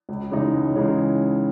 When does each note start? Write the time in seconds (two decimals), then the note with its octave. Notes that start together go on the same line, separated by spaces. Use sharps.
0.09 C#2
0.31 C#3 E3 G#3 D#4
0.53 C#2
0.75 C#3 E3 G#3 D#4